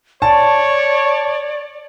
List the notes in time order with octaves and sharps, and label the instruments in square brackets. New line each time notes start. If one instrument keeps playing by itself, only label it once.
[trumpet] C#5 [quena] D5 [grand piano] A5